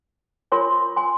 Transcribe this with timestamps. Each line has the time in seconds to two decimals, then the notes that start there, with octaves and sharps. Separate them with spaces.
0.52 F4 A#4 C#5 G#5 C6
0.96 G#5 C6